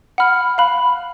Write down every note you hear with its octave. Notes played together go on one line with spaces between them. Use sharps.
F#5 B5 F6
F5 B5 F#6